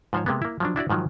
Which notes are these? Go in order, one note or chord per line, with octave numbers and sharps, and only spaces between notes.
G#2 F3 C5 C#5
C3 G#3 A#3 B3
A#3 E4
F3 F#3 D4
D4 E4 F#4 D5
G#2 D#3 F3 F#3